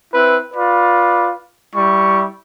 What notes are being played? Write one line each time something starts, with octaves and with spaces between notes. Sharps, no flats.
C4 E4 B4
F4 B4 D5
G3 E4 C#6